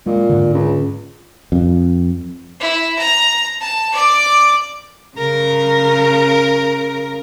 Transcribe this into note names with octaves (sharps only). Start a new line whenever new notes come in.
A#2 G#3
G#2 D3
C#2
F2
E4
A#5
A5
D5 D6
C#3 A#4